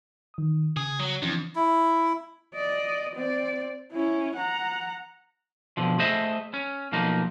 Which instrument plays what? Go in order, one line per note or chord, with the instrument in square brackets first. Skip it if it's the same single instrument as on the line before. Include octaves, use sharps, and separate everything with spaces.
[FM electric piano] D#3 D#6
[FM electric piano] C#3 [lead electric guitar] G#4
[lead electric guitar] F#3
[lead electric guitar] F2 [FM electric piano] E3 C#4 D4
[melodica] E4
[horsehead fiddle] D5 D#5
C4 D5
C#4 E4
F#5 A#5
[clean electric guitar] B2 D3 F3
A3 G#4 C5 D#5 E5
C#4
B1 F3 A#3 D#4